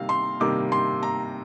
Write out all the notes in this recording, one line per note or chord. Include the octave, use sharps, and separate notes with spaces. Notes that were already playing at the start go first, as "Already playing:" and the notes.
Already playing: C3 D#3 G3 A#3 F5
C6
C3 D#3 G3 A#3 D6
C6
A#5